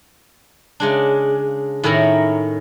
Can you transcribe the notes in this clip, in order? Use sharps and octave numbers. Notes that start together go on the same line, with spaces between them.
C#3 G#3 D4
A2 D#3 C#4 E4 A#4 A#5